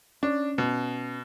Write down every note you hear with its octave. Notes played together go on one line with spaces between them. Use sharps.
C#4 D4
B2